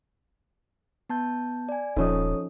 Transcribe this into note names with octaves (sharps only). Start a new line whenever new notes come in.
B3 A5 G6
D5 G#5
D#1 F3 C#4 D#4 A4 C#5 D#6